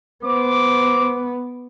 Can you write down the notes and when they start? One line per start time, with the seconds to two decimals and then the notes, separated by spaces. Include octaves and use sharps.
0.24 B3 C5 D6